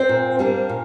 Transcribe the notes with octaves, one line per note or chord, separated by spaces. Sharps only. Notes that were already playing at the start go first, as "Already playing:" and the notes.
Already playing: C4 C5
A#2
G3 A#3 D4
A#2